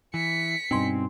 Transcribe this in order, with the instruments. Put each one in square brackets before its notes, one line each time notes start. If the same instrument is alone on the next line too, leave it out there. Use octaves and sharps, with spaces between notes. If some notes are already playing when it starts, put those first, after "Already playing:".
[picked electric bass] E3 [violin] B6 C#7
[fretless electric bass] G2 B2 [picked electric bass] C4 [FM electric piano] D#4 G#5 C6